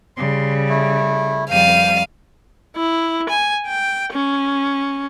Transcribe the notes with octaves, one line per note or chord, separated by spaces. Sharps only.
C#3 G3 C6
A3 E4
F2 G3 F5 G5 D#7
E4
G#5
G5
C#4